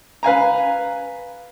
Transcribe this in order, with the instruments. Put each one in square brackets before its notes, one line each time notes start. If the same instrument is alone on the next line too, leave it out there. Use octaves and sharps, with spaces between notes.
[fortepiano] B4 F5 G#5 A#5